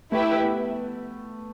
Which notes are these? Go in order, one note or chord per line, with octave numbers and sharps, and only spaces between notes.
A3 E4 G4 B4 E5
B3